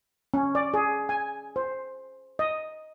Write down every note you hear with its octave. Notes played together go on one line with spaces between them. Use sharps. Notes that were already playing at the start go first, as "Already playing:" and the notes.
C#4
D5
G#4
G#5
C5
D#5